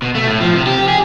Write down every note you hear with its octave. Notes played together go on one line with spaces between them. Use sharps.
B2
A3
A2
F3
C3
G4
G#4